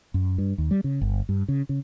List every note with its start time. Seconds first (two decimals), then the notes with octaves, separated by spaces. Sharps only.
0.14 F#2
0.38 G2
0.58 D#2
0.71 G3
0.84 C#3
1.01 G1
1.29 G2
1.48 C#3
1.69 C#3